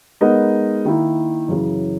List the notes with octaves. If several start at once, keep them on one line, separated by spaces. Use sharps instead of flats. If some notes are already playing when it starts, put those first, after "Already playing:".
G#3 B3 D#4 A#4 D#5
D#3 A#3 E4
F#2 C#3 E3